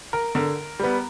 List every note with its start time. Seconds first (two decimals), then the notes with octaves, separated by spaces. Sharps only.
0.13 A#4
0.35 D3 A#4
0.80 G3 B3